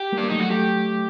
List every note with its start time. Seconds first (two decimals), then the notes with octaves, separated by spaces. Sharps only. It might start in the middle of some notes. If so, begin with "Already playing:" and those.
Already playing: G4
0.12 G3 A#3
0.18 D4
0.24 A#3
0.30 F#3 A3 D#4
0.40 F#4
0.50 F#3 A3 G4